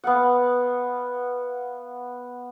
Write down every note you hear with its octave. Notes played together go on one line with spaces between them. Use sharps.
B3 F5 F#5